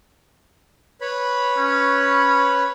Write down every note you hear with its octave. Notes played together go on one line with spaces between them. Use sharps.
B4 C#5 B5
C#4